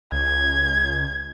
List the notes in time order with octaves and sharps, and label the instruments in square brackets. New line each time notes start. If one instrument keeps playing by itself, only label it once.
[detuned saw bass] C#2 [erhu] G#6